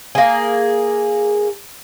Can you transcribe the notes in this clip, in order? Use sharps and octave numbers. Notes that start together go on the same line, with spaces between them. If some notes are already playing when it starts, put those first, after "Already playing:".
A#3 G#4